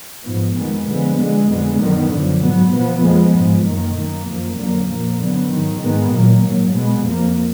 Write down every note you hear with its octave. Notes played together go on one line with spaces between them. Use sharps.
G#2 F3 B3
F2 D#3 G#3 B3
D3 F3 G#3 B3
D3 G#3 B3
F2 D3 G#3 B3
F#2 D#3 F#3 B3
F#2 D3 F3
G#2 F#3 B3
A#2 F3 B3
F2 F3 G#3 B3
G#2 F3 G#3
F#2 D#3 A#3
F#2 D#3 A#3
F#2 F3 A#3
F2 D3 F#3 A#3
A#2 F3 A#3
F#2 D3 F#3 B3
G#2 D#3 F#3
G#2 D#3 G#3 B3
A#2 F#3 A#3
G#2 F#3 A#3
B2 G#3 B3
F2 F3 A#3